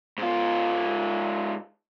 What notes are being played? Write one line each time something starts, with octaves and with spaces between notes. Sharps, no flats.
G#2 F4